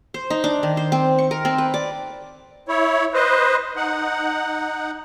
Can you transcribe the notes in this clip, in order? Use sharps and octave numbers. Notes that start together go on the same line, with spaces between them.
C5
D#4
D4
D#3
C5
C4
C#6
A#4
C4
B4
D5
E4 C#5
B4 C5 D#5
D#4 F#5